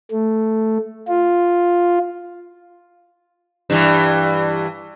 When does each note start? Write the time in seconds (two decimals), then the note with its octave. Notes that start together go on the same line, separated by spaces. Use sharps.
0.11 A3
1.08 F4
3.70 G2 E3